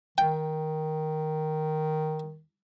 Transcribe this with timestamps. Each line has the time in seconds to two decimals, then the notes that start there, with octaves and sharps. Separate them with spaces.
0.18 D#3 G5